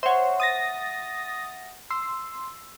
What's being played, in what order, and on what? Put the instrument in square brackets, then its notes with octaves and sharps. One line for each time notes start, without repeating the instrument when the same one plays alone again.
[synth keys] C5 C#5 [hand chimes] E5 F#5
[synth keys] D#6 A6 A#6
[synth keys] C6 [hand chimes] E6